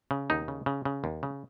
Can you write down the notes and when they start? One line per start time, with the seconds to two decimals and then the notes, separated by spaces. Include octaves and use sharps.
0.11 C#3
0.30 D#2 D#4
0.48 C#3
0.66 C#3
0.85 C#3
1.04 D#2
1.23 C#3